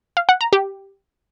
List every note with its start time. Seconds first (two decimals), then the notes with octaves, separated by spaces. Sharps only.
0.17 F5
0.29 F#5
0.41 A#5
0.53 G4